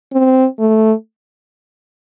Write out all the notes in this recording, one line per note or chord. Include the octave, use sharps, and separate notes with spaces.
C4
A3